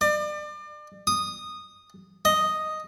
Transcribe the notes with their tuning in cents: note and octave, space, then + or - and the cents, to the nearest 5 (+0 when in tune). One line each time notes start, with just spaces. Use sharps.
D5 +35
D#6 -10
D#5 +0